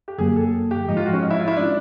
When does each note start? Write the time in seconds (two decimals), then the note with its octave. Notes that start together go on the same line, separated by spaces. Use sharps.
0.08 G4
0.18 F#2 D3 F#3 A#3 G#4
0.36 A4
0.71 G4
0.88 G#2 F3 G#3 D#4
0.97 F4
1.05 F#4
1.13 C#4
1.22 D#4
1.30 E4
1.39 F4
1.48 E4
1.57 F3 G#3 C#4 D4 F4